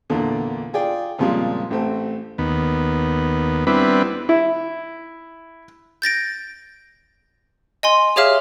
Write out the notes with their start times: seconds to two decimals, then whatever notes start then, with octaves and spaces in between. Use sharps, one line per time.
0.10 E2 A#2 D3
0.73 F4 G#4 D5 G5
1.18 F2 A#2 C#3 F3 G3 G#3
1.70 A1 A3 C4
2.38 D#2 B3
3.67 G3 B3 C4 D4 E4 B4
4.29 E4
6.02 G6 A6 A#6 D7
7.83 D#5 G#5 C6
8.16 G4 G#4 C#5 E5 F5 F6